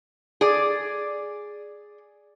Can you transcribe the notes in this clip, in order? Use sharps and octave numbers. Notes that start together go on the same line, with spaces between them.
G#4 D5